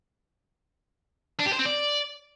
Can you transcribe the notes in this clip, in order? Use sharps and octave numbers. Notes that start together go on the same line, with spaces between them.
D4
G4
C5
C4
D5